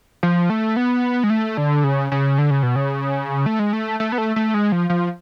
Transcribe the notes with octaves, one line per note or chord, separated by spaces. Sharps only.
F3
A3
B3
G#3
A3
D3
C#3
C#3
D3
C#3
B2
C#3
A3
G#3
A3
A3
B3
A3
A3
G#3
F3
F3